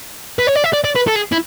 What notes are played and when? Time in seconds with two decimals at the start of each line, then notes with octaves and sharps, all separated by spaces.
0.39 B4
0.47 C#5
0.56 D5
0.64 E5
0.73 D5
0.84 D5
0.96 B4
1.07 A4
1.15 G#4
1.32 E4